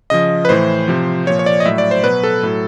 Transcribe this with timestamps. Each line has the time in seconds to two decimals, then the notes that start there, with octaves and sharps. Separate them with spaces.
0.10 C#3 F3 D#5
0.45 B4
0.49 A2 E3 C5
0.88 C3 F3
1.26 A#2 F3 C#5
1.39 C#5
1.46 D5
1.60 D#5
1.65 A2 F#3 E5
1.78 D5
1.91 C5
2.04 B2 F#3 B4
2.23 A4
2.43 A2 F#3